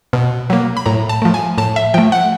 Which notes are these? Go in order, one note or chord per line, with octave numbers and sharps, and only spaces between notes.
B2
F#3 A#3
B5
A2 A#5
A5
F3 A3
G#5
A2 A5
E5
F3 A3 G5
F#5